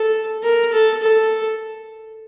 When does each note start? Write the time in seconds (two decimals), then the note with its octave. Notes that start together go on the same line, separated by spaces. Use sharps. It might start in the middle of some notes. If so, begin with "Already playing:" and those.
Already playing: A4
0.43 A#4
0.73 A4
1.02 A4